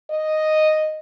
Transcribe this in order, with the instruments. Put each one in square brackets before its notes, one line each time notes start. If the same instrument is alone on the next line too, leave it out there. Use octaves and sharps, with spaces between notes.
[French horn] D#5